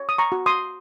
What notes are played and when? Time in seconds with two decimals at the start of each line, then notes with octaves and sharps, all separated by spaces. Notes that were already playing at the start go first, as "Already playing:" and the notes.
Already playing: C#5
0.09 D#6
0.18 A#5 C#6
0.32 F#4
0.46 C6 D#6